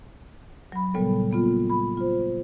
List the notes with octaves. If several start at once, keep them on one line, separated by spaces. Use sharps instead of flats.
F#3 B5
A#2 C#3 G3 B3 A4
A#3 B3 F4
B5
F4 C5